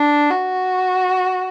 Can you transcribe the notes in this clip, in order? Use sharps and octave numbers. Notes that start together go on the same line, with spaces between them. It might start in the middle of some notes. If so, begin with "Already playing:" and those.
Already playing: D4
F#4